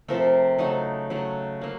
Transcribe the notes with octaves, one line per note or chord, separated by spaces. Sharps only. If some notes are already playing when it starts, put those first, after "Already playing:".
C3 F3 A3 A#4
C#3 F#3 A3 D#4
C#3 F#3 A3
F#3 A#3